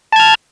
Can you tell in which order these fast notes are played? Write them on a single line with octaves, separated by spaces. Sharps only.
A5 G#6 F6